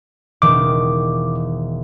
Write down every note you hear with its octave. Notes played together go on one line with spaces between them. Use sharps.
E1 D#3 D6